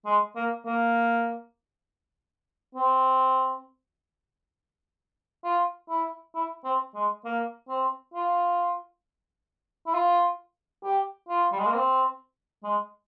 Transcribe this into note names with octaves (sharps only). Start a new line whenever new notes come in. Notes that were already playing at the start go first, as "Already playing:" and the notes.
G#3
A#3
A#3
C4
F4
E4
E4
C4
G#3
A#3
C4
F4
E4
F4
G4
F4
G3
G#3
A#3
C4
G#3